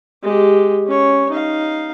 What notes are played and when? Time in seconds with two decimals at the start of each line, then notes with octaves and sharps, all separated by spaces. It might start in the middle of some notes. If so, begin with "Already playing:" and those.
0.23 G#3 G4
0.87 C#4 C#5
1.30 D#4 F5